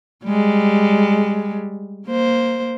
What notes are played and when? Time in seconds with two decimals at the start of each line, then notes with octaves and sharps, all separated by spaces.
0.25 G3 G#3
2.07 A#3 C5